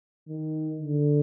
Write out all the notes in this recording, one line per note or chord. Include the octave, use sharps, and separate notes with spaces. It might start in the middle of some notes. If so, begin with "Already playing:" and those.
D#3
D3